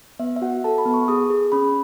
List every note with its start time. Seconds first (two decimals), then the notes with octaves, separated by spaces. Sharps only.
0.20 B3 E5
0.36 E5
0.42 F#4 F#5
0.64 A4 A5
0.78 B5
0.86 B3
0.94 C#6
1.08 G#4 D#6
1.30 G#4
1.52 C#4 B5